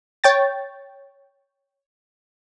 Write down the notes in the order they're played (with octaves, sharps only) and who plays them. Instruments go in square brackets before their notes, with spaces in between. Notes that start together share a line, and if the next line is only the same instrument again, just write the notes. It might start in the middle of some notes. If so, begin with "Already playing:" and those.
[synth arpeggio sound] C#5 G5 A6